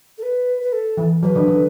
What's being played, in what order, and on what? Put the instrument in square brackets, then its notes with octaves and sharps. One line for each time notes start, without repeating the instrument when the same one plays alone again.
[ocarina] A4
B4
B4
A4
[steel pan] E3
[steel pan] F#3 [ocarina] B4
[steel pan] D3
D3